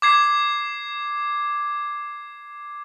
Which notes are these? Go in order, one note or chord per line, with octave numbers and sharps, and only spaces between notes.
D6 G#6 C7